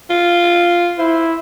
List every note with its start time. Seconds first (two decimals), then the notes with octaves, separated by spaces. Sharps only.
0.10 F4
0.99 E4 C5